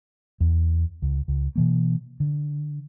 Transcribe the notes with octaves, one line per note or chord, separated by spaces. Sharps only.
E2
C#2
C#2
B2 E3 A#3
D3